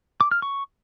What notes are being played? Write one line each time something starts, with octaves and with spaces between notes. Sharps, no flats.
D6
F6
C#6